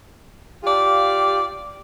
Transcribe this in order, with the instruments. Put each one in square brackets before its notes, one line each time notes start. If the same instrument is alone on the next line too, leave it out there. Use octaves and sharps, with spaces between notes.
[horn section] F4 G4 D5 F5